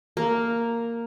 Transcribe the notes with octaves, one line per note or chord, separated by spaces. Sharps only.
A#3